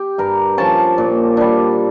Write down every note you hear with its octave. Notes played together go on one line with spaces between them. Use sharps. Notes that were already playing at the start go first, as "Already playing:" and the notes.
Already playing: G4
G2 A#4
F3 C#4 A5
A#2
G3 D4